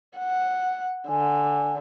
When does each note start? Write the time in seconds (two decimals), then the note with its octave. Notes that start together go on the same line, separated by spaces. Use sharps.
0.17 F#5
1.09 D3 G#5